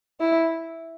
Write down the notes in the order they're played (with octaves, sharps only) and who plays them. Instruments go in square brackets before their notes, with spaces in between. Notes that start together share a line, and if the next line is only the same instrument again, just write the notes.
[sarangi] E4